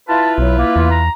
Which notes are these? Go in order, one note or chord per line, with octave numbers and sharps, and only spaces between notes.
E4 F4 B4 A5
B1 F#3
A#3
E2
A#5